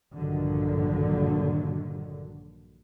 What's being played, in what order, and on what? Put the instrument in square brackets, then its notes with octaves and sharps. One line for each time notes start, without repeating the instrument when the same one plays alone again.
[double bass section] A#1 G2 D3 D#3 F#3